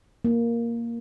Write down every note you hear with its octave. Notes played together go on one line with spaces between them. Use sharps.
A#3